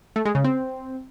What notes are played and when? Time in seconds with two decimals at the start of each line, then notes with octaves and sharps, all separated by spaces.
0.16 A3
0.25 G#3
0.35 C#3
0.44 C4